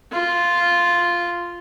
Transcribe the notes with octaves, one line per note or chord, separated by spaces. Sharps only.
F4